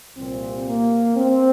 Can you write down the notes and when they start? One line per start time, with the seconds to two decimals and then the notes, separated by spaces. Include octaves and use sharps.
0.16 C2 A#2 F3 C4
0.66 A#3
1.16 C4